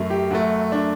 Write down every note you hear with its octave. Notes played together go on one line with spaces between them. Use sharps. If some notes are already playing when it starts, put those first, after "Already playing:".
Already playing: F#2 F#3 A3
G4
F#2 F#3 A3 F#4
D4